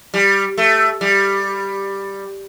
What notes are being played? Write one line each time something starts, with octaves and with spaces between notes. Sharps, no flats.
G3
A3
G3